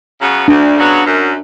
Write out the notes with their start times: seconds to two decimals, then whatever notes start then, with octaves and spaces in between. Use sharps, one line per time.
0.20 C#3 F#3 B3
0.48 D2 D4
0.77 C#3 F#3 B3
1.05 F#2